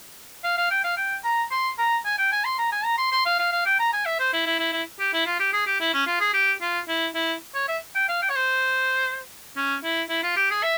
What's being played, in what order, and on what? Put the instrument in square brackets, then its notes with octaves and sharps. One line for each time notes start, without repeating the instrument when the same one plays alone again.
[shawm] F5
F5
G5
F5
G5
A#5
C6
A#5
G#5
G5
G#5
C6
A#5
G#5
A#5
C6
C6
F5
F5
F5
G5
A#5
G#5
E5
C5
E4
E4
E4
E4
G4
E4
F4
G4
G#4
G4
E4
C#4
F4
G#4
G4
F4
E4
E4
C#5
E5
G5
F5
G5
C#5
C5
C#4
E4
E4
F4
G4
G#4
E5